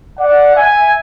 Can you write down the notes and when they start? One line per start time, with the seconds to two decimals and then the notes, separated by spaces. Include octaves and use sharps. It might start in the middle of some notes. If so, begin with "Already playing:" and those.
0.19 D5 F#5
0.56 E5 G#5